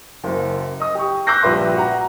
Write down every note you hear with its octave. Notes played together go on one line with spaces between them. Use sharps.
F#1 F#2
D#5 D#6
G4 C#6
D6 E6 F#6 G6 A#6 C7
A#1 G3 B4 E5 C6
F#4 F#5 A#5